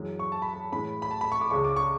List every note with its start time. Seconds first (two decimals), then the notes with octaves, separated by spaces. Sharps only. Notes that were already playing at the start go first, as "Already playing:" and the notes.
Already playing: F#2 E3 G#3
0.19 C#6
0.32 A5
0.42 B5
0.53 A5
0.72 A2 E3 G#3 B5
1.02 B5
1.11 A5
1.21 B5
1.32 C#6
1.41 D6
1.50 C#2 C#3 G#3 C#6
1.64 D6
1.76 C#6